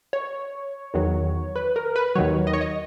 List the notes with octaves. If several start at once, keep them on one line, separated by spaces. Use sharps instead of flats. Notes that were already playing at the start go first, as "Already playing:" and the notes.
C#5
E2 D#3 F#3
B4
A#4
B4
D#2 D#3 F#3 C#5
D#5
C#5
D#5